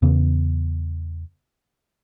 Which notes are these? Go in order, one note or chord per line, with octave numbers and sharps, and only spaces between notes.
E2 C#3 B3